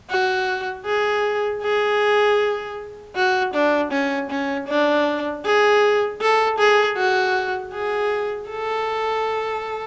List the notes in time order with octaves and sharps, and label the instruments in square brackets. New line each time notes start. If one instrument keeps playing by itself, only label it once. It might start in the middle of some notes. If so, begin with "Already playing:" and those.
[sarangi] F#4
G#4
G#4
F#4
D4
C#4
C#4
D4
G#4
A4
G#4
F#4
G#4
A4